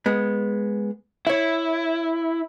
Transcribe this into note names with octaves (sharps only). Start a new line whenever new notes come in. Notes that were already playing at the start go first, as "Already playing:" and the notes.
G#3 B3
E4 C#5 E5